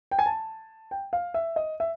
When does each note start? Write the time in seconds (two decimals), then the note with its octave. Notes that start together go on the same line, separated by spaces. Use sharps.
0.11 G5
0.19 G#5
0.26 A5
0.91 G5
1.13 F5
1.34 E5
1.56 D#5
1.80 E5